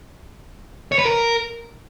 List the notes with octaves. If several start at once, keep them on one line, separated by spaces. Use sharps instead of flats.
C#5
B4
A#4